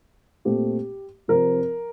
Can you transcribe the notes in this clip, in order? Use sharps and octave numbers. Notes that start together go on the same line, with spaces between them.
A#2 A3 C4 G4
C3 F3 C4 A#4